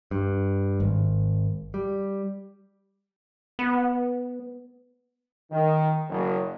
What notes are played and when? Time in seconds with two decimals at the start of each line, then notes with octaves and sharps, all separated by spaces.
0.11 G2
0.80 G#1
1.74 G3
3.59 B3
5.51 D#3
6.09 F#1